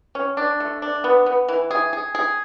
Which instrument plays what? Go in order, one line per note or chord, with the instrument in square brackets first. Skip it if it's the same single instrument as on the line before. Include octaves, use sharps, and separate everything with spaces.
[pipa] C#4
D4
A3
D4
B3
B3
E3
G#4
G#4
G#4